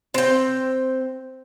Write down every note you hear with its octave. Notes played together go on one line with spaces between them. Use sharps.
C4 G5